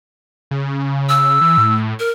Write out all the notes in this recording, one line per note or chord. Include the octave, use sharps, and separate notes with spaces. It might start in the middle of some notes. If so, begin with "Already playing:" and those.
C#3
E6
E3
A2
A#4